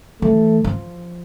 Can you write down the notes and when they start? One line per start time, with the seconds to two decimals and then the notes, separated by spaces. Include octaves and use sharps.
0.22 E3 A3
0.64 F3